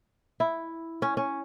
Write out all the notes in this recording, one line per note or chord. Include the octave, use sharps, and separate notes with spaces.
E4
C#4
C#4